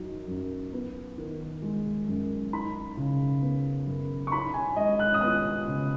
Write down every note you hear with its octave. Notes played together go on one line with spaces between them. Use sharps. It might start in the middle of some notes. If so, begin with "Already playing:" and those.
Already playing: F#2 F#3 D#4
F#2
B3
D#3
G#3
F#2
D#4 B5
C#3
B3
F#2
C#6
D#4 B5
G#5
G#3 D#5
F#6
D#6
B3 F#6
C#3